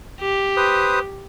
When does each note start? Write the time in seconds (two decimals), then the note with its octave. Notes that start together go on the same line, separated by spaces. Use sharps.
0.21 G4
0.57 B4 C5 D#6